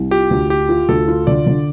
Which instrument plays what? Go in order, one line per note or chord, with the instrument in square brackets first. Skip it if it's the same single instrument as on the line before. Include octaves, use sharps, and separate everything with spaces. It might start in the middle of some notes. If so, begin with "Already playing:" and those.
Already playing: [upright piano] C2
[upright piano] F4 [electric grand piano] G4
[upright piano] D2
[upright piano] F4 [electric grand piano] G4
[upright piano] F4
[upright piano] D2 [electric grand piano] A4
[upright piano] F4
[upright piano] D3 [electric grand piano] D5
[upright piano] D3